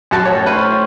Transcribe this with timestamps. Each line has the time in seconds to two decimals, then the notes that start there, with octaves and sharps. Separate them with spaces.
0.11 F#2 F#4 A4 A5
0.25 A2 C#5
0.46 C#4 B4 C5